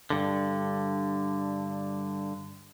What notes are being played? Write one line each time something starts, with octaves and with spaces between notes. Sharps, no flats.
G2 D3